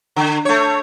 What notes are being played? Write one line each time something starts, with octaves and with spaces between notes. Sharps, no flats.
D3
A3 C#5